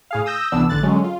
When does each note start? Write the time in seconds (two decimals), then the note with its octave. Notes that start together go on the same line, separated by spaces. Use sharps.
0.11 A2 G#4 F5
0.26 D#6 E6 G6 A#6
0.52 C2 E3 B3 D4 E6
0.69 A1 D3 F#6 A6
0.83 D3 F#3 G#3 C#4
1.04 F4